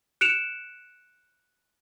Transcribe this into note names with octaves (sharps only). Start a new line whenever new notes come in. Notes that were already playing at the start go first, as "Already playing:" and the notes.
F#6 C#7 D7 E7 F7